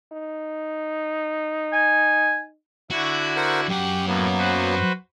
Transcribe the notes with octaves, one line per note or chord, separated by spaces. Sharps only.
D#4
G#5
D3 E4 F#4
A#4 C5 F#5
F#2 G4 F#5
A2 F#3 A#3 B3
F#4 B4 C5